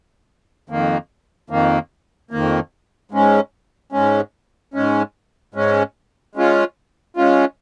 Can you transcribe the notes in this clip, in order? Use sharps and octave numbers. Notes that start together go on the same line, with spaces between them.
F2 D#3 A#3
F2 D#3 A#3
F2 D#3 A#3
G#2 G#3 C#4
G#2 G#3 C#4
G#2 G#3 C#4
G#2 G#3 C#4
G#3 C#4 F4
G#3 C#4 F4